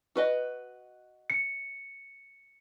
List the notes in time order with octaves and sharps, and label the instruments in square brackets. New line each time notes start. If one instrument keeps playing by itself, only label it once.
[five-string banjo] F#4 B4 D#5
[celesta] C#7